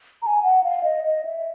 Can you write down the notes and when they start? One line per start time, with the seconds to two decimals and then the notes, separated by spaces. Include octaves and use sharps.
0.22 A#5
0.26 G#5
0.43 F#5
0.64 F5
0.84 D#5
1.04 D#5
1.25 E5